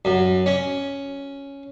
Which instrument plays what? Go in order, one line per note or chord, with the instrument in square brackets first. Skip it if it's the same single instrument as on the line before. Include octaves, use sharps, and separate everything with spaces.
[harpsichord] F#2
C#4